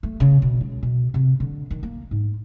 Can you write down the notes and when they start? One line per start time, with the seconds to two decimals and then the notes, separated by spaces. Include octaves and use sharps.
0.03 A3
0.20 C#3
0.42 B2
0.61 C#2
0.83 B2
1.14 C3
1.40 D3
1.70 D#3
1.83 A#3
2.11 G#2